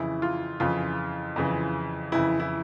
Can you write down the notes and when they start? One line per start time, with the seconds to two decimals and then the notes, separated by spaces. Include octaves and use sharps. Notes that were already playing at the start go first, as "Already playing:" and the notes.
Already playing: F2 C#3 E3 E4
0.22 F4
0.60 F2 C#3 E3 F4
1.36 F2 C#3 E3
2.12 F2 C#3 E3 E4
2.40 E4